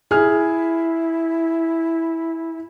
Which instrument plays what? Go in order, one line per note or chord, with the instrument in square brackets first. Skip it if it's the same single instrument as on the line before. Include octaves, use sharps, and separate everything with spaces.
[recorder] E4 [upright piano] G#4 F6